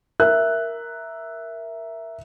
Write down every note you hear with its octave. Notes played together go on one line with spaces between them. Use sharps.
A#4 E5 F#6